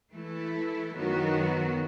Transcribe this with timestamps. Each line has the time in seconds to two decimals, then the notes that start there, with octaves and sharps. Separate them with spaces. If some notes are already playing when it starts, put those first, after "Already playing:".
0.14 E3 A3 E4 A4
0.96 F#2 D#3 F#3 B3 F#4